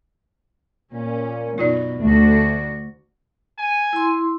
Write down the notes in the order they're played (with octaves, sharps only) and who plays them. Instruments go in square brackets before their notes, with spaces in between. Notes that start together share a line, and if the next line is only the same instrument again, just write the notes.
[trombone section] A#2 [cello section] C#4
[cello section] F#2 B2 [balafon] D#4 F4 D5
[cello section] D2 D4 F#4 [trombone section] A3
[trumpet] G#5
[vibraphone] E4 C6